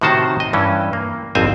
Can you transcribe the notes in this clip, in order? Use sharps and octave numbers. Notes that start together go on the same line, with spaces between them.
A2 C3 D#3 F#4 C5 A5
D#5
G2 E3 C#4
A#3
G#1 F2 C4 C5 G#5 A#5